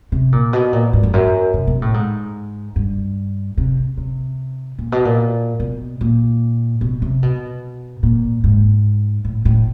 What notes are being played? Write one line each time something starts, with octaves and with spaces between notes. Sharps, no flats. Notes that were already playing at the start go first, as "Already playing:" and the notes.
C3
A#2
B2
A#2
G#2
F2
F#2
C3
B2
A2
G#2
G2
C3
C3
A#2
B2
A#2
B2
A#2
B2
C3
B2
A#2
G#2
A2
A2